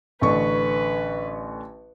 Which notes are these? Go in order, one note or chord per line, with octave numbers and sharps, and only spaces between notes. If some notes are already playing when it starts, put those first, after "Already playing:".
A1 D3 B4 C#6